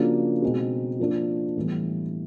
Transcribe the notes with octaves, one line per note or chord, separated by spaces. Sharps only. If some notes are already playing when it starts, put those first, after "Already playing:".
Already playing: C#3 F3 A#3 D4 F#4
B2 G#3 C4 D#4 F#4
F3 A#3 D4
A2 E3 G3 B3